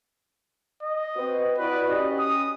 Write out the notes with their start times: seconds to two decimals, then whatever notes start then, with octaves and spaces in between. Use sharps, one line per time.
0.83 D#5
1.16 C4 F#4 B4
1.58 E4 F#4 B4 D5
1.89 C#4 G4 D#5
2.19 D#6